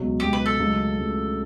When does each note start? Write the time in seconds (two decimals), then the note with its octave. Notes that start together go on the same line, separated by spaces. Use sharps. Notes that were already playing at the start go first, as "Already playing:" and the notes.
Already playing: C#2 B2 F#3
0.20 C#2 B2 F#3 G4
0.33 B4
0.46 A4
0.59 C#2 C#3 F#3 A3
0.98 C#2 C#3 F#3 A3